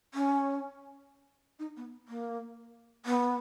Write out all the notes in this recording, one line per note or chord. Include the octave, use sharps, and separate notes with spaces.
C#4
D#4
B3
A#3
B3